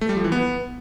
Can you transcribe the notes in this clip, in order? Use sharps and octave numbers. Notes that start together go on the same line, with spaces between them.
A3
G3
F3
E3
B3